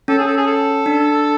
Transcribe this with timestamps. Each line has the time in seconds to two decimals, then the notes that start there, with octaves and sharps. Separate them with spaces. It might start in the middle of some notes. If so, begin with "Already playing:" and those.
0.08 C#4 A4
0.18 G#4
0.27 A4
0.37 G#4
0.47 A4
0.86 D4